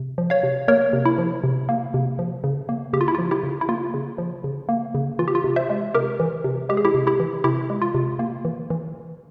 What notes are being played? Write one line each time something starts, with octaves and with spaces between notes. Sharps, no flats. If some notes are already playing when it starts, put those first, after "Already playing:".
Already playing: C3
F3
C#5 F5
C3
A#3 A#4 C#5
C3
E4
F3
C3
A#3
C3
F3
C#3
A#3
C#3 G4
F4
E4
F3 F4
E4 G4
C#3
E4
A#3 F4
C#3
F3
C#3
A#3
C#3
E3 F4
G4
F4
C3
C5 E5
G#3
C3 G4 A#4
E3
C3
G#3 G4
G#4
E4 G4
C3
E4 G4
E3
C3 E4 G4
G#3
F4
C3
A#3
E3
E3